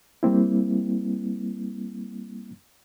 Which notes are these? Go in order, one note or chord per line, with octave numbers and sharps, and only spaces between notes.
G3 A#3 C4 E4